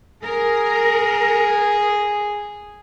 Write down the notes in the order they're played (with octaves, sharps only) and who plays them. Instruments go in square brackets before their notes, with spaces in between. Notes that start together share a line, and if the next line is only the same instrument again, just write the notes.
[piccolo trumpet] G#4 [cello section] A#4